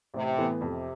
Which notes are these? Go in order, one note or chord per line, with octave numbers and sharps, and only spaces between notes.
A1 C3
A2 E3 B3
F2 C3